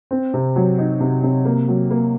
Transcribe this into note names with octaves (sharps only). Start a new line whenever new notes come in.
C4
C3
F#3
D#4
C3
C3
A#3
F#3
A#3